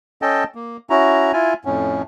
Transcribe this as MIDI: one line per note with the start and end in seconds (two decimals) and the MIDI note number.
0.22 0.44 61
0.22 0.44 69
0.22 0.44 75
0.22 0.44 79
0.22 0.44 81
0.55 0.77 58
0.90 1.32 61
0.90 1.32 64
0.90 1.32 66
0.90 1.32 82
1.33 1.54 64
1.33 1.54 65
1.33 1.54 80
1.65 2.02 41
1.65 2.02 45
1.65 2.02 61